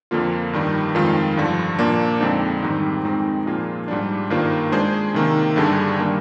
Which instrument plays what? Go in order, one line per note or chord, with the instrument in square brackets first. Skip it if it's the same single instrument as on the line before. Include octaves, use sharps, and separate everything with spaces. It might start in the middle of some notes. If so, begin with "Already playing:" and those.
[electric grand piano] F2 D3 F3 A#3 F4
G2 D#3 G3
F2 D#3 G#3 C4 F4
G2 D3 F3
A#2 F3 A#3 D4
F2 D3 G#3 C4 D#4
G#2 D#3 G3 C4
F2 D#3 G#3 C4 D#4
A#2 F3 A#3 F4 G#4
G#2 G3 D4
G2 D#3 A#3 F4 C5
G#3 D4 G#4 C5
C3 D#3 A#3
G2 D3 G3 D4 G#4
D#3 G3 A#3